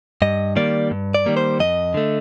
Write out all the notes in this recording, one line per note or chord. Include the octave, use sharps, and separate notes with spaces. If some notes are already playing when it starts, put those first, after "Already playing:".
G2 D#5
D#3 G3 A#3 D5
G2
D5
D#3 G3 A#3
C5
F2 D#5
D3 A3